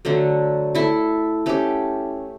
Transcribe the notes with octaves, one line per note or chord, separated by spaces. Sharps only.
D3 F#3 A3
A3 E4 A4
A3 C#4 G4